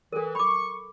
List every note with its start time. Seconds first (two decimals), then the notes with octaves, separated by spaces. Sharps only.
0.13 E3 A4 A#4
0.35 B5 C#6 D6